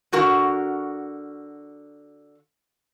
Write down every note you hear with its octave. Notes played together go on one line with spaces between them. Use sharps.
D3 F#4 A#4 F#5